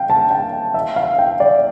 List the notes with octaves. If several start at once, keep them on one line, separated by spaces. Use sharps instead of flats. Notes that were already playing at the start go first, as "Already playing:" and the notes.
Already playing: F5 G5
A5
G5
E5
F5
G5
D5